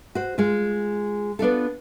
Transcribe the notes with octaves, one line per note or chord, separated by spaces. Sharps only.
F#4 C5
G#3 F4
B3 D4 F4 A4